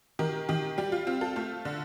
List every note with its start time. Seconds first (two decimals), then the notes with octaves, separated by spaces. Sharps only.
0.19 D#3 G4 A#4
0.49 D#3 G4
0.78 G3 G4
0.92 F4
1.07 C4 F4
1.21 F4 A4
1.36 A3 F4
1.65 D3